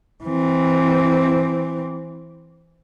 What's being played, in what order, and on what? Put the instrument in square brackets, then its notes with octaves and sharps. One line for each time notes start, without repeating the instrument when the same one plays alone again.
[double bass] E3 C4